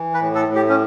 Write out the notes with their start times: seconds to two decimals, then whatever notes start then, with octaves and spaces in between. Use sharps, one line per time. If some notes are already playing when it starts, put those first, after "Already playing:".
Already playing: E3
0.14 B4
0.21 A2
0.35 A4
0.48 A2
0.55 G4
0.69 C#4